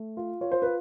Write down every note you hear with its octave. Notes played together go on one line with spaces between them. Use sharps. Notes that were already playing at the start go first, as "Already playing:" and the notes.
Already playing: A3
F4
F4 C#5
C5
F4 B4